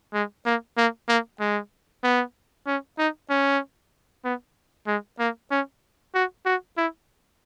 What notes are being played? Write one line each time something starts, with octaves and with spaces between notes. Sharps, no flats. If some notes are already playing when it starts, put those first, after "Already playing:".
G#3
A#3
A#3
A#3
G#3
B3
C#4
D#4
C#4
B3
G#3
A#3
C#4
F#4
F#4
E4